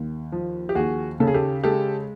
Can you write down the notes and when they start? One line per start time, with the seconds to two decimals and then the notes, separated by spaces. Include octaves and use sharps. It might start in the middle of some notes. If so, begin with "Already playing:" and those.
Already playing: D#2
0.32 F3
0.69 G4
0.75 D#2 F#4 G#4
1.20 C#3 A4
1.27 G#4
1.34 G4 A4
1.64 G#3 G4 A4